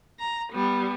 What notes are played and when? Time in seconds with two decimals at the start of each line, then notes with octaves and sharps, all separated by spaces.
0.20 A#5
0.53 G3 B3